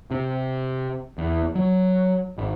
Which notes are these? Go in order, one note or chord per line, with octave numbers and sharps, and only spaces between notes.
C3
E2
F#3
G#1